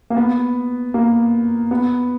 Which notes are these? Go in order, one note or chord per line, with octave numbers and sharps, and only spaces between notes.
A#3
B3
A#3
B3